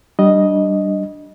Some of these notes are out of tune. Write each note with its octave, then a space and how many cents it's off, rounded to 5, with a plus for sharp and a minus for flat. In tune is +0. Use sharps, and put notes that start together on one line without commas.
G3 -20 D4 +0 D#5 +0